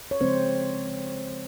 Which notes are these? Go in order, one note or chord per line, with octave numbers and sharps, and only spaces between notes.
C#5
C#3 F3 G#3 C4 C5